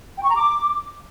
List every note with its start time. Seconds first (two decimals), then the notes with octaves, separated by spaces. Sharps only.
0.17 G5
0.23 C#6
0.30 A#5
0.36 D6